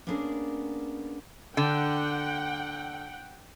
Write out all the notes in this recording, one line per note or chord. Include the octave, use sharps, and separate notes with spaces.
A#3 B3 C#4 D4 G#4 A#4
D3 F#5 G5